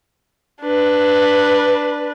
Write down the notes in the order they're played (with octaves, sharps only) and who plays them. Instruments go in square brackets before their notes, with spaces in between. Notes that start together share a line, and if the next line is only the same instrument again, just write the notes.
[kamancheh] D4 B4